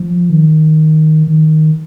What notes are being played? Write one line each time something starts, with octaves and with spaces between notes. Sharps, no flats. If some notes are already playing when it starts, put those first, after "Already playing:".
Already playing: F3
D#3
D#3